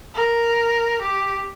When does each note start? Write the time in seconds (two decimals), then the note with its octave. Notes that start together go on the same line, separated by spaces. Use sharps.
0.15 A#4
1.02 G4